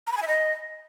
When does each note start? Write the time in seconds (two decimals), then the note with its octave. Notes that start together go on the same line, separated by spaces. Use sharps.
0.07 A#5
0.12 B5
0.17 G#5
0.22 E5
0.27 D#5